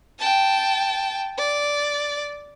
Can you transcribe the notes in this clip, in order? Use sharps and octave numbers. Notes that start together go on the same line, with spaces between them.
G5 A5
D5